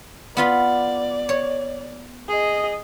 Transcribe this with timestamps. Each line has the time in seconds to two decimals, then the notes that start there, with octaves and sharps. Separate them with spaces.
0.37 B3 F4 D5 B5
1.29 C#5
2.28 G#4 D#5